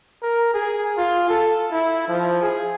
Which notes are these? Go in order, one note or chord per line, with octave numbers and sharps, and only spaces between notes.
A#4
G#4
F4
A4
E4
F3
G#4